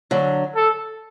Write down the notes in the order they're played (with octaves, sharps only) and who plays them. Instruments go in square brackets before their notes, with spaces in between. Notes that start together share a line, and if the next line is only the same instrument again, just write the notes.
[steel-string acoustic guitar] D3 F#3
[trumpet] A4